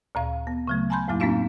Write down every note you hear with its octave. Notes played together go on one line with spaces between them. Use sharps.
D2 A#2 F5
B3
C#3 F#3 A3
G#5 A5 B5 C6 G6
F2 A2 F#3 A#3 E4
A#3 C4 C#4 D#4 F#4 F5